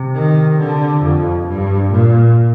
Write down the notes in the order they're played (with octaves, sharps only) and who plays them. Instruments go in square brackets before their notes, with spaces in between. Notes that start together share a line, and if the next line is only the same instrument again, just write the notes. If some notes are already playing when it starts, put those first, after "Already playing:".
Already playing: [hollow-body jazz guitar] C3
[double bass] D#3
D3
F2
G2
A#2